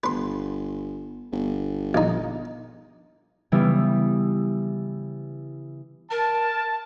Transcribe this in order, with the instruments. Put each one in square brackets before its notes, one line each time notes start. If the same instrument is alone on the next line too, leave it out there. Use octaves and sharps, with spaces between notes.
[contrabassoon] G1 [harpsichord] B4 C6
[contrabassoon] G1
[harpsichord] A#1 D#4
[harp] C#3 E3 G3 B3 E4
[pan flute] A#4 [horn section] A5